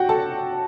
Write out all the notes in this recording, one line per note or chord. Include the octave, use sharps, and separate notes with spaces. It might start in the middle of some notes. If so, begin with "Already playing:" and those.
Already playing: F#4 G4 F#5 G5
A4 A5